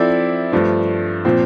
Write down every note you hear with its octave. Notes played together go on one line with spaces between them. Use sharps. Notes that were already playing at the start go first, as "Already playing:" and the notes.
Already playing: F3 C4 E4 A4 D5
G2 F3 A3
A#2 F3 C4